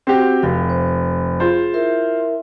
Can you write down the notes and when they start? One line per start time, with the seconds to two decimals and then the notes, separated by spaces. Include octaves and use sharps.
0.07 C4 F#4 G4
0.43 F1 F5
0.70 C5
1.40 F4 G#4 C5
1.73 E4 A#4 E5